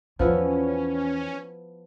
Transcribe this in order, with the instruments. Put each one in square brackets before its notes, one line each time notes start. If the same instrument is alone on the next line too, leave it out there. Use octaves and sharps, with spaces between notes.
[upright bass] E2 D#3 [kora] F3 B3 E4 [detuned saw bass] C#4